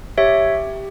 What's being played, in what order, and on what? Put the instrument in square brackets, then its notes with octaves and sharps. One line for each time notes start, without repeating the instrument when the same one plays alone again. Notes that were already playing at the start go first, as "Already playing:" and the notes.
[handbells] G4 C#5 E5